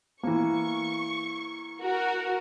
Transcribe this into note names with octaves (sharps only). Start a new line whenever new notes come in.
E3 A#3 C#6
F#4 A#4